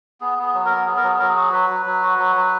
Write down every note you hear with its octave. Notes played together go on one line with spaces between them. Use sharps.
B3 G#4
B3 G#4
F#3
B3 A#4
B3 G#4
A#4
F#3 G#4
F#3 A#4
G#4
F#4
F#3 B4
F#3
F#3
F#4
F#3
F#3